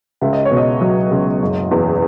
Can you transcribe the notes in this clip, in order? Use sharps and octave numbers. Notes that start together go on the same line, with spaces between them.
C#2 E5
D#5
C#5
B2
D#5
F#3
C#2
F#1
E2